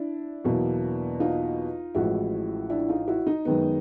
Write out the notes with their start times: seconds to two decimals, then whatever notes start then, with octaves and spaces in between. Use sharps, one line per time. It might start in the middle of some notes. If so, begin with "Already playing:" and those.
Already playing: D4 E4
0.45 E2 B2 F#3 A#3
1.20 D#4 F4
1.95 A1 A2 F3 G#3 E4 F#4
2.70 D4 E4
2.89 D#4 F4
3.08 E4 F#4
3.27 D#4
3.45 F#2 D#3 G#3 B3